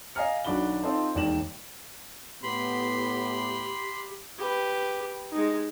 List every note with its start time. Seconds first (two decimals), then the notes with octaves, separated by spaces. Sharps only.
0.15 D#5 F5 G#5 A#5 F6 C#7
0.45 B1 D#3 D4 F#4 B5 G7
0.83 C4 D#4 F4 A4 C5
1.15 E1 D#2 D#3 D5 E7 F#7
2.43 A2 B3 G4 B5 C6
4.38 G4 B4
5.32 G#3 D#4